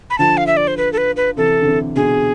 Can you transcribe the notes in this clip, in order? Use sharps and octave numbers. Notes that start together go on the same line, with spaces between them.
B5
D3 F3 A5
F5
E5
D5
C5
B4
A4
B4
B4
C3 E3 A4
D3
C3 E3
B2 D3 G#4